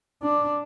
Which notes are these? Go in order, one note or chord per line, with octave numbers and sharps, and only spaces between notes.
D4